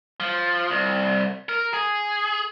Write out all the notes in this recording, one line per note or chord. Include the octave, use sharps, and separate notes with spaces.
F3
C2
A#4
G#4